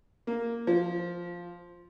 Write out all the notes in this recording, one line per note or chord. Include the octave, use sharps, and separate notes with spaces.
A#3
F3